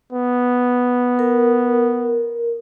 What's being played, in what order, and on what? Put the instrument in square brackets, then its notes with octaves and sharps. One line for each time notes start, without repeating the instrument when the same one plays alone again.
[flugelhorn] B3
[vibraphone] A#4